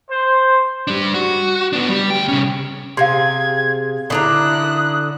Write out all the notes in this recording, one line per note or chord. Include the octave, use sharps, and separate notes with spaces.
C5
G3 D4
F#4
B3 D4
G3
D2 G5
C3 C#4
C3 G#4 F5 C6 G#6
D3 D4 E4 A#5 D#6 F#6